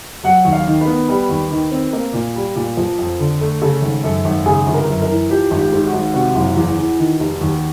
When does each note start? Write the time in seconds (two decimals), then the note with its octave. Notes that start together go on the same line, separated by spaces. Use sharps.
0.24 F#3 F#5
0.45 D#2
0.53 F5
0.67 D#3
0.81 B4
0.87 B3
1.08 G3 B4
1.29 D#2
1.51 D#3
1.72 C4
1.93 A#3 A#4
2.13 A#2
2.35 G3
2.55 A#2
2.77 F3
2.98 F2
3.19 D3
3.41 A3
3.61 C#3 A4
3.82 G#1
4.03 F#2 A4
4.25 G#1
4.46 C#3 G#4
4.66 G1
4.74 A#4
4.88 F#2
5.02 A#4
5.10 E3
5.30 F3 G4
5.51 G#1
5.58 G4
5.72 G#2
5.86 F#4
5.93 G#1
6.14 C3 F#4
6.35 F#1
6.56 E2
6.78 E3
6.99 D#3
7.20 F1
7.41 D#2